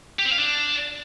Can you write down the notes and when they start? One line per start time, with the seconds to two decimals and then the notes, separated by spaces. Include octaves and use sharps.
0.19 G4
0.25 C4
0.31 F5
0.38 D4